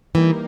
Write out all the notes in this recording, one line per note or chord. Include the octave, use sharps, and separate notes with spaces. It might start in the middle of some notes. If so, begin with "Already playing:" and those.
E3 G3 A#3 D#4 G4 A#4